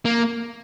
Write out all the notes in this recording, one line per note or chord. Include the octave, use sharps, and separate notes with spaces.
A#3